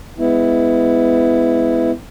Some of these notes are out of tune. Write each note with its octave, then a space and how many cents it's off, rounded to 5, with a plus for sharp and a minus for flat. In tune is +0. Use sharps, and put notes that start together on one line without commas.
G#3 -5 B3 +25 E4 +0